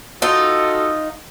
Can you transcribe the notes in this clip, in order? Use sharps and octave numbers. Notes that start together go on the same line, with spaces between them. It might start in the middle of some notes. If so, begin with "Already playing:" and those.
D#4 F4 F#4 A4